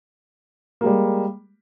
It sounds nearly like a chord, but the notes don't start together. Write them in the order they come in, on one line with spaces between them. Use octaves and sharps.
A#3 G#3 G3